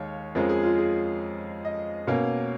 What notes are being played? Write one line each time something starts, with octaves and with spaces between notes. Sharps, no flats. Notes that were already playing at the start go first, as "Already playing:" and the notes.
Already playing: D#2 G#3 C#5 F5
F2 F3 G#3 C#4 A#4
G#4
F4
G#4
D#5
B2 A#3 C#4 F5